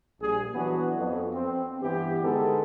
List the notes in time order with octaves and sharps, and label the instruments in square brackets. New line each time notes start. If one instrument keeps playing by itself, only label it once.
[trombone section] A#1 G3 G#4
E3 F#3 B3 D4 F#4
F2 B3
C4
G2 E3 B3 G4
D3 G#3 B3 D#4 G#4 A4